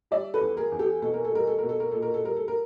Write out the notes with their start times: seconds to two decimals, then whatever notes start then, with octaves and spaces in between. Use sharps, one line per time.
0.11 G3 D5 E5
0.34 A4 B4
0.41 E2
0.57 G#4 A#4
0.72 E2
0.79 G4 A4
1.02 B2 A4
1.14 A#4
1.25 A4
1.32 G3 A#4
1.47 A4
1.58 B2 A#4
1.69 A4
1.80 A#4
1.92 A#2 A4
2.02 A#4
2.14 A4
2.23 G3 A#4
2.37 A4
2.48 A#4